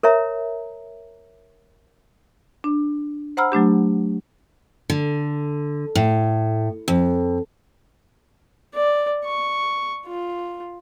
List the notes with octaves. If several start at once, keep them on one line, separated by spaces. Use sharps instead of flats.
A#4 C#5 E5 A#5
D4
C5 F#5 A#5 B5 E6 F6
F#3 A3 D4 G4
D3
A2
F2
D5
C#6
F4